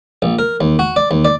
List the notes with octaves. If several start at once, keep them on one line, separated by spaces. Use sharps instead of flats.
A#1
A#4
D#2
F#4
D5
D#2
D5